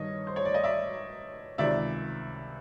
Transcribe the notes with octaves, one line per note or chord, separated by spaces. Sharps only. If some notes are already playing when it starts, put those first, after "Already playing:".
Already playing: G2 D#3 C#5 D#5
C5
C#5
D5
D#5
D5 E5
C#2 C3 D#3 D5 E5